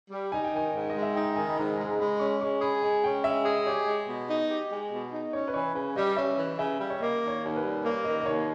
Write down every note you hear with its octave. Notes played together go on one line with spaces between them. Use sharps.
G3
D#4 G#5
G5
D#3 G#5
G#2
G#3 D#5
E5
D#4 G5
D#3 G#5
B5
G#2 A#5
G#5
G#3 A#5
A#5
G#3 B5
C#4 C#6
G#3 C#6
G#4 B5
G#3 G#5
C#4 G5
G#3 E5
G#4 D#5
G4 C#5
G#3
B2
D#4
G4
G#3
B2
D#4
C#4 C#5
B4
E3 C#5
C#3 B4
G3 D#5
C#4 E5
E3
C#3 E5
G3
C#5
A#3 D#5
D#3
C#5
D#2 C#5
B4
G3
A#3 C#5
D#3 D#5
D#5
D#2 C#5